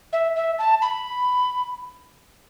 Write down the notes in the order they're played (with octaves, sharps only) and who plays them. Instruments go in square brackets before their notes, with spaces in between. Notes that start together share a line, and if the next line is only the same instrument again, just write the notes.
[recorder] E5
E5
A5
B5